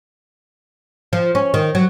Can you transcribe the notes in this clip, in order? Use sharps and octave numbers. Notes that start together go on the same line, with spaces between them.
F3
C#4
D#3
F#3